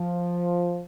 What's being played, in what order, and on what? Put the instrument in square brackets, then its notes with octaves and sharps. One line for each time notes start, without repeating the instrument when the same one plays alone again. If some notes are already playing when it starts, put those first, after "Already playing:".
Already playing: [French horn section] F3